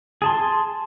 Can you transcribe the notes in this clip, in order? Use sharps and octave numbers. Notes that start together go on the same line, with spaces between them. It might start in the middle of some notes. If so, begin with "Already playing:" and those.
G#4 A5 C6